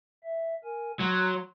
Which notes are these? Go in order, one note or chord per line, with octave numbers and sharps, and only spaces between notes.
E5
A#4 G#5
F#3 A#5 C6